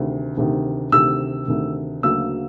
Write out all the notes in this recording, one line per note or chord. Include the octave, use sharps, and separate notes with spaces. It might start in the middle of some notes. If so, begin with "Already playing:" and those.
Already playing: D2 C3 D#3
D2 C3 D#3
D2 C3 D#3 E6
D2 C3 D#3
D2 C#3 F#3 A#3 E6